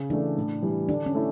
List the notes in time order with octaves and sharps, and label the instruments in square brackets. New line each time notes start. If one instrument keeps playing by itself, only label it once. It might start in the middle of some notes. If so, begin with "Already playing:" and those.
Already playing: [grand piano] C#3
[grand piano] E3 A3 [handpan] D4
[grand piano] A2
E3 G3
[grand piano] D3 [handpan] D4
[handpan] C#4
[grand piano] A3 E4